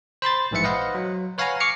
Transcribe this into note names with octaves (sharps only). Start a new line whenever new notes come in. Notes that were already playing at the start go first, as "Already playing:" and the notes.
C5 B5 C6 A6
A#1 G#2 E3 B4 E5 C#7
B4 C5 D#5 F5 F#5
F#3
B4 C#5 F5 F#5 G#5 A#5
C#6 D6 F6 C7 C#7